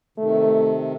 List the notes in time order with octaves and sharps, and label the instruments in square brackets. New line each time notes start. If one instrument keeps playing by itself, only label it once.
[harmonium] C3 D#3 [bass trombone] A3